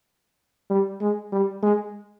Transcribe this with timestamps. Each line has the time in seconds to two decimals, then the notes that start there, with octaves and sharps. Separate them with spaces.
0.70 G3
1.01 G#3
1.32 G3
1.63 G#3